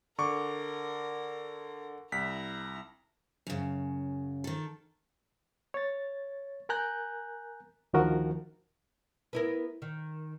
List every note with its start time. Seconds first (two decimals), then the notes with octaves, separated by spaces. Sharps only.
0.19 D3 A#4 C#6 D6
2.12 C2 E4 A#5 B6
3.47 F#2 C#3
4.44 D#3 A4
5.74 C#5 A6
6.69 A#4 G#5 A#5 F#6 G6
7.93 D2 D#3 F3 F#4 A#4
9.33 B3 E4 A#4
9.82 D#3